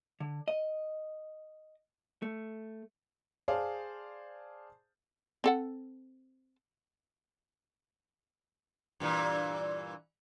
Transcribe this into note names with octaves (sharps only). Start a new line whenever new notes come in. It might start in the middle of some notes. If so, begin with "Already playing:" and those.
D3
D#5
A3
G#4 C5 D5 F5 A5
C4 A4 F#5
G2 A#2 E3